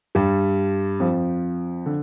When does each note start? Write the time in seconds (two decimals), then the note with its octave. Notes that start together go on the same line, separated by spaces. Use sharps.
0.15 G2 G3
1.00 F2 F3
1.86 D3